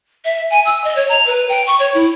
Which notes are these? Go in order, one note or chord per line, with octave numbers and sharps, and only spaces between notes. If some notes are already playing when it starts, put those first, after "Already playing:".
E5
G#5
E6
D#5
C#5
A#5
B4
G5
C#6
C#5
E4